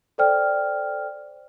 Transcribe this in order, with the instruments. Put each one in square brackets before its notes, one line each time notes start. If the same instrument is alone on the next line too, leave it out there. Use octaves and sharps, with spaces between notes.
[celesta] A4 C5 D5 G5 F6